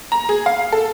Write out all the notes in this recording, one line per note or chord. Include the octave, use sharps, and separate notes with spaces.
A#5
G#4
F5
A4